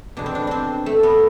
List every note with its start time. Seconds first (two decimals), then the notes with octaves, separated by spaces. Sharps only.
0.17 E2 B2 D4
0.26 C4
0.35 D4
0.47 C4 D4
0.86 A3
1.03 B3